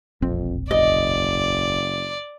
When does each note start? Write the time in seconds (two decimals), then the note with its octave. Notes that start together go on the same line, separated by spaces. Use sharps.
0.22 E1 A#1 F2 C4
0.71 F#1 D5 D#5